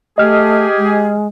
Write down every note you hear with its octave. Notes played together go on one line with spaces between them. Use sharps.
A3 G4 G#4 D#5 F6
G#3